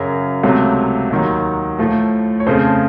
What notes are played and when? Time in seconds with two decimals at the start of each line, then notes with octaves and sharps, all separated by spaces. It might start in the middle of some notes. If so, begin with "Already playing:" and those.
Already playing: F#2 C#3 F#3 A#4
0.43 C#2 C3 F#3 A3
1.11 D#2 D#3 F#3
1.79 A2 F3 A3
2.40 C#5
2.46 F2 C#3 A3 C5